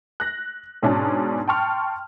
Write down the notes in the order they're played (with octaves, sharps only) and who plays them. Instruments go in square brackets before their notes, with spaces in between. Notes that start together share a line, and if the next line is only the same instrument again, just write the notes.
[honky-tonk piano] F#6 A#6
G#2 B2 C#4 D4 A5
G5 A5 C6 C#6 F6